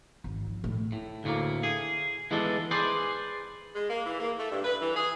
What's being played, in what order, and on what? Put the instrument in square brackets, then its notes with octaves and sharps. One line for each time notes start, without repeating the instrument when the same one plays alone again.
[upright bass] G#1
F3
A2
[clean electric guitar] A2
D2 A2 A#3
G#4
E3 G#3 B3 D4 G#4 A4
G#4 B4 C5 D5
[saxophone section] G#3
A#3
E3
A#3
A3
G2
B4
E3
G#4